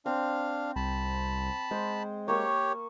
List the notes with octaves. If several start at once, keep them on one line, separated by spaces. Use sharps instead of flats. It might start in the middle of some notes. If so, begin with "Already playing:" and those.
C4 D4 F5
C2 A5 B5
G#3 C5
A#3 G4 C#5 C#6